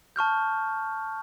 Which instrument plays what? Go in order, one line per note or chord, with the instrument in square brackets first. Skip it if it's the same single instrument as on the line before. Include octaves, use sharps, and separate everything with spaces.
[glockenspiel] A5 C#6 F6 G6